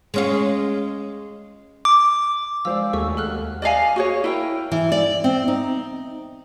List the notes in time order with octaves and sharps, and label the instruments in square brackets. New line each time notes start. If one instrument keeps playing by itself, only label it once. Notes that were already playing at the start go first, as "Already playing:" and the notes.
[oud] G#3 C#4 F4
[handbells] D6
[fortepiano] F3 C5 D5 [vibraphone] G#3 F5 [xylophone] E6
[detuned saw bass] D#2 [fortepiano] A3 F#4 G#4 [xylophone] C#6 E6
[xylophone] A4 F6 F#6 [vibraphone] F#5
[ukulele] D5 D#5 F5 G#5
F#4 G#4 C#5
E4 A#4 G5
[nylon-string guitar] E3
D5
C4
D#4